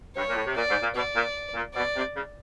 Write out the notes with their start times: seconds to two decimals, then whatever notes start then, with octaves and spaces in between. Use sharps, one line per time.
0.16 G2 C#5
0.28 A#2
0.36 A2
0.45 C3
0.56 A#2 D5
0.69 G#2
0.82 A#2
0.95 B2 D5
1.15 A#2
1.54 A#2
1.74 B2 D5
1.95 C3
2.14 C#3